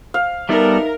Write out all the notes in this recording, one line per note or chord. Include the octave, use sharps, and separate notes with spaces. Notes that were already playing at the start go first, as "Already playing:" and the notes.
F5
G3 B3 D#4 A4 A#4 E5